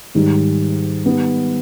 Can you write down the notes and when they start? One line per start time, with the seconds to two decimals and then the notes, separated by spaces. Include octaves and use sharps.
0.15 G#2 D#3 G3
1.06 D#3 G3 B3